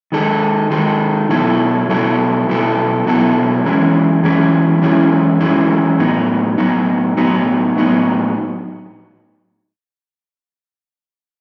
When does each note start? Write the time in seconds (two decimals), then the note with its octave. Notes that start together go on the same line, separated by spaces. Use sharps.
0.12 D#3 G#3 D#4 A4
0.71 D#3 G#3 D#4 A4
1.29 B2 F#3 B3 E4 A4
1.88 B2 F#3 B3 E4 A4
2.47 B2 F#3 B3 E4 A4
3.06 B2 F#3 B3 E4 A4
3.65 F#2 E3 G#3 C#4 E4
4.23 F#2 E3 G#3 C#4 E4
4.82 F#2 E3 G#3 C#4 E4
5.41 F#2 E3 G#3 C#4 E4
5.99 A2 F#3 B3 D#4
6.58 A2 F#3 B3 D#4
7.17 A2 F#3 B3 D#4
7.76 A2 F#3 B3 D#4